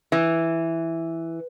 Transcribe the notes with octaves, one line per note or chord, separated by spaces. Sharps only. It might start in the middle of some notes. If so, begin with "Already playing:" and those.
E3